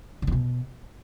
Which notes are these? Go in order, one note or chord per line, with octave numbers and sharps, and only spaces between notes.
D3
E2
B2